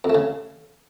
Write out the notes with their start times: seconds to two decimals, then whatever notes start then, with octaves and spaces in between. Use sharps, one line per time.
0.04 F2
0.10 A3
0.15 C#3